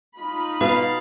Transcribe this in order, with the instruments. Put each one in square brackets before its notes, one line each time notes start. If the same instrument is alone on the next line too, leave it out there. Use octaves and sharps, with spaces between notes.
[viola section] D#4 F4 B5
[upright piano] B2 [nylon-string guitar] B4 [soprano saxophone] F5